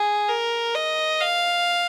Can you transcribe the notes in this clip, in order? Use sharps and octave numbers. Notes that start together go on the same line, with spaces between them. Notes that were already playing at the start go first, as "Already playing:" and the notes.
Already playing: G#4
A#4
D#5
F5